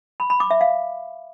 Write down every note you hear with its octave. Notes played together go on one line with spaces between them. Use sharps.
B5
B5
D6
E5
F5